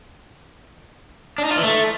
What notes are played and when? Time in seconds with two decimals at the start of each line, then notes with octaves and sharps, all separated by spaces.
1.38 D4
1.45 D#4
1.51 F4
1.57 E3
1.63 A3